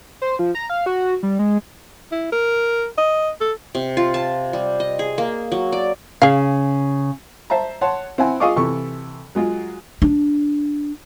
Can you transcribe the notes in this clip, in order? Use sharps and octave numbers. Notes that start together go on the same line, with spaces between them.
C5
F3
A#5
F5
F#4
G3
G#3
E4
A#4
D#5
A4
C3
F4
A5
G3
D#5
G#4
A#3
F#3
D5
C#3 G#4 F5
C5 E5 A5 A#5
C#5 F#5 A5 C6
C4 E4 F#5 G#5
F4 G#4 D#5 F5 C#6 D6
C3 E3 A4 C#6
F#3 G#3 F4
D4